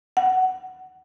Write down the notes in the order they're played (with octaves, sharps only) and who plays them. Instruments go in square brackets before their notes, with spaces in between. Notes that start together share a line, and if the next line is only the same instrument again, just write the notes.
[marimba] F#5